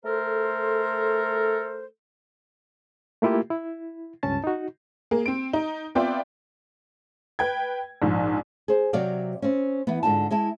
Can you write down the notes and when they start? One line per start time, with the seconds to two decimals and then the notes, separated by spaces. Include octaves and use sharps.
0.05 A3 A4 A#4 C5
3.22 A3 A#3 E4 F4 G4
3.50 E4
4.23 C#2 G2 C#4 A5 A6
4.44 D#4 F#4
5.11 A#3 G#4
5.26 C4 D7
5.53 D#4
5.95 B3 C4 F4 D5 E5 G5
7.39 B4 G5 G#6
8.02 A#1 G#2
8.68 G#4 C5
8.93 C3 F#3 C#5 D5 F5
9.42 C4 C#4
9.87 E3 B3
10.03 G#2 D3 F4 A5
10.31 G#3 E4 A5